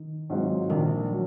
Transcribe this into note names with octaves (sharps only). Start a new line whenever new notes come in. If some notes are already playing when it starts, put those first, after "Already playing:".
Already playing: D#3
G#2 F#3 C4 F4
A#1 D#3
F#3